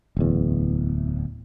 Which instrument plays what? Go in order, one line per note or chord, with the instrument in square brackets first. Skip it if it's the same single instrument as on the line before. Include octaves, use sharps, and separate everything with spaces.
[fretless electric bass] D1 E2